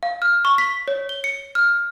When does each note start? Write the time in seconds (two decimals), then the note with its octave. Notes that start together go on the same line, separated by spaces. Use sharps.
0.03 F5
0.22 F6
0.45 C#6
0.58 B6
0.88 C#5
1.09 G7
1.24 C#7
1.55 F6